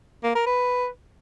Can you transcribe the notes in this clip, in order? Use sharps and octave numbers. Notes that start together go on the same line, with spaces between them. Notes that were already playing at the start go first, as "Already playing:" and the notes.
A#3
A#4
B4